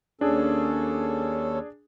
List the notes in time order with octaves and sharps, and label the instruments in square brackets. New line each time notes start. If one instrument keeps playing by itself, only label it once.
[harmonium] D#2 C#4 A4 [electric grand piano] D4 G#4